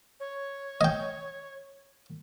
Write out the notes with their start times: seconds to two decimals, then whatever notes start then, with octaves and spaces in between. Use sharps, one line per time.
0.20 C#5
0.81 D#5 G5